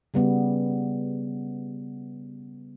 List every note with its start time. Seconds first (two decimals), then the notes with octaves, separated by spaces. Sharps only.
0.14 C#3 G3 B3